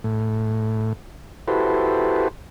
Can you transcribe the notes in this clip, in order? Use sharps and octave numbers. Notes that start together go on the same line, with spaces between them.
A2
E4 F#4 G4 A4 B4 C5